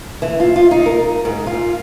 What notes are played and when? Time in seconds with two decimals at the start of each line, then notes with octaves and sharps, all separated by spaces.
0.22 E3
0.40 F4
0.56 F4
0.71 D#4
0.86 A#4
1.25 G#2
1.46 F4